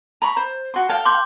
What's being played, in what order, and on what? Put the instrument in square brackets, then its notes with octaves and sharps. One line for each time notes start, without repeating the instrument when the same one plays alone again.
[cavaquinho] A#5 B5 C#6
C5
F#4 C6
A4 F5 G5
[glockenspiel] C6 D6 G6